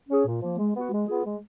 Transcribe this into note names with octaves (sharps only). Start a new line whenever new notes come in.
C#4 G#4
A#2
F3 A#3
G#3
B3 F#4
G#3
B3 F4 G#4
G#3